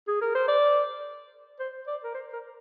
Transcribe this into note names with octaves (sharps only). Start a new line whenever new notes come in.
G#4
A#4
C5
D5
C5
D5
A#4
C5
A#4